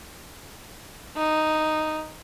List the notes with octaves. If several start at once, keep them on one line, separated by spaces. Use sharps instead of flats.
D#4